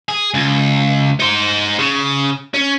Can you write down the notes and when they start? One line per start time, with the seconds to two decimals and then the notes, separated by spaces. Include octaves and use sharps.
0.08 G#4
0.34 C#2
1.20 D#4 C5
1.79 C#3
2.54 C#4